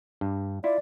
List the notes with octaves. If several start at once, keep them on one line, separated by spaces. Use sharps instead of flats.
G2
E4 F4 D5